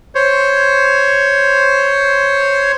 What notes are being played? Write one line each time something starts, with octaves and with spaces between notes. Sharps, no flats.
C5 C#5